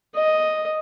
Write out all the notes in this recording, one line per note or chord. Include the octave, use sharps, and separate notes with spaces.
D#5